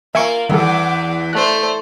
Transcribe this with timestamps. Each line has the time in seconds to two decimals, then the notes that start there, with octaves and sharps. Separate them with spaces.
0.15 A#3 F4 A#4 E5 G#5 C#6
0.49 E2 D#3 G3 A4 F#5 D6
1.33 A3 C5 D5 F#6